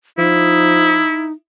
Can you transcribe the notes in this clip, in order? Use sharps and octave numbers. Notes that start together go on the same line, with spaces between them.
F3 D#4 E4